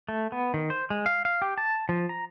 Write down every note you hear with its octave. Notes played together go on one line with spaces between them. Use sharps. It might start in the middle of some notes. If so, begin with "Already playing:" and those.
A3
B3
D#3
C5
G#3
F5
F5
G4
A5
F3
A#5